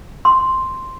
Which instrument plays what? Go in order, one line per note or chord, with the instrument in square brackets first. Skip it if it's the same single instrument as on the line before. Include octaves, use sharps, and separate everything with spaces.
[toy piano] C6